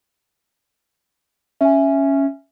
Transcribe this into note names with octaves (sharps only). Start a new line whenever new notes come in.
C#4 E5 G#5